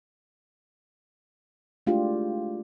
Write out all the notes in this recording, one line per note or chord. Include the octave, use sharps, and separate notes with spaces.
G#3 A3 D4 E4 F4 G4